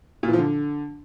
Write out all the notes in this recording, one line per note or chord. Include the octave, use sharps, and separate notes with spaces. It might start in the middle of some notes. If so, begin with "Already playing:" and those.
A#2
E3
F3
D3